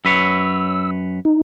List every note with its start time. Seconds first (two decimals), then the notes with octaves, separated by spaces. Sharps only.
0.05 F#2 B4 C#5 E6
1.25 D#4